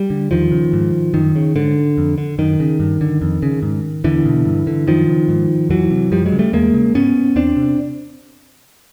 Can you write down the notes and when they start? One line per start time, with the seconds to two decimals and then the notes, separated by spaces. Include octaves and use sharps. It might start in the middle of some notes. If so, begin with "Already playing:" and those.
Already playing: G3
0.10 D3
0.31 E2 D#3 F3
0.52 C#3
0.73 G#2
1.14 F#2 D#3
1.36 C#3
1.56 G#2 D3
1.98 F2
2.18 D3
2.38 F#2 D#3
2.60 C#3
2.80 G2
3.01 D3
3.22 F2
3.43 C#3
3.63 G#2
4.04 E2 D3 E3
4.26 B2
4.45 G2
4.67 D3
4.87 F#2 D#3 F3
5.08 C#3
5.29 G#2
5.69 F2 E3 F#3
5.90 C3
6.11 F#2 F3 G3
6.26 F#3 G#3
6.32 C#3
6.39 G3 A3
6.53 E2 G#3 A#3
6.74 C#3
6.94 G#2 B3 C#4
7.35 E2 C4 D4
7.56 C3